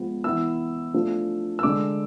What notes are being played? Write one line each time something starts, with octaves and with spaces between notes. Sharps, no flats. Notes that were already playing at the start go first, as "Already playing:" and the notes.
Already playing: F3 G#3 B3
E3 B3 E4 E6
F3 A3 D4
E6
D3 G#3 D4 D6